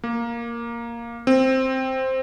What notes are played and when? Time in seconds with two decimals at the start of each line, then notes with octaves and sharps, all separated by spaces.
0.04 A#3
1.27 C4